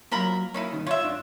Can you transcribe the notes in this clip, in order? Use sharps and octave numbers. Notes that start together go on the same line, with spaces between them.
F3 F#3 A#3 A#4 B5
A#3 C#4 D#4 E4
C2 G2 D#3
F4 C#5 E5
G#2 D4